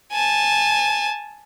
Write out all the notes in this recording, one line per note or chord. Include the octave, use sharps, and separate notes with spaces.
G#5 A5